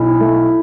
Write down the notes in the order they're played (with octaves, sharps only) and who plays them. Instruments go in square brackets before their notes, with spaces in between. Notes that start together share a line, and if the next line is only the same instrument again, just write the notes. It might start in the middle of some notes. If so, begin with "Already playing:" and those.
Already playing: [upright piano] B1 [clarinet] E4
[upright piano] A3